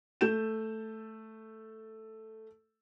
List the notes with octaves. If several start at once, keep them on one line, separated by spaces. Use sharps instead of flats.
A3 A4 G6 E7